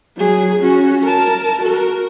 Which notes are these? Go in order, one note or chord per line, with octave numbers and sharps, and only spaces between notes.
F#3 G#4
C#4 F#4
A#4 A5
F#4 A#4